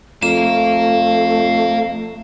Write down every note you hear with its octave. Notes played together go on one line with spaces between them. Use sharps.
F2 A3 F5 A#5 E7